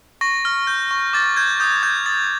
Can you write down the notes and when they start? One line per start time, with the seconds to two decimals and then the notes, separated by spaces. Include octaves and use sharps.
0.21 C#6 A#6
0.45 F6
0.67 G6
0.91 C#6
1.13 D6 A6
1.37 G6 G#6
1.60 D#6 G6
1.83 G6 G#6
2.06 D#6 A6